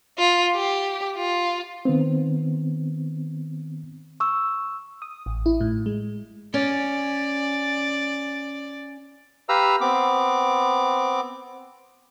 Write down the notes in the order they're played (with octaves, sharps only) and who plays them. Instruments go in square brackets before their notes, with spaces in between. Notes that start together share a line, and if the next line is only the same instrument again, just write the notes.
[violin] F4
G4
F4
[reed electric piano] D#3 B3 C4
[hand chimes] C#6 E6
[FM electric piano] D#6
A1
E4
A2
G#3
[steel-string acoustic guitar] C#4 [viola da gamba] D5
[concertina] G4 B4 F5 A#5 E6
B3 C4 D6